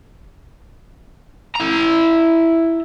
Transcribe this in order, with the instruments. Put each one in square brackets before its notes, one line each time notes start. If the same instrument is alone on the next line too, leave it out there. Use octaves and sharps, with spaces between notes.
[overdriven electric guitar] E4 A#5